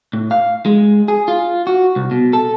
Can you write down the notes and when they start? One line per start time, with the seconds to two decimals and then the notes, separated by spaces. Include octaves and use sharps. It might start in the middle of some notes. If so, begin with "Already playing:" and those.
0.13 A2
0.31 F5
0.66 G#3
1.08 G#4
1.28 F4
1.67 F#4
1.96 C2
2.11 B2
2.33 A4